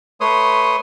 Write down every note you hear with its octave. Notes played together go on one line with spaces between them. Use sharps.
A3 B4 C#5 C6 D#6